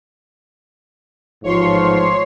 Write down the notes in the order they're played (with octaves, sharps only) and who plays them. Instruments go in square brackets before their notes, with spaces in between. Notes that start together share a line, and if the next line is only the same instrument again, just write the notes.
[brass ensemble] A1 G#2 F3 [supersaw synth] C#5 C6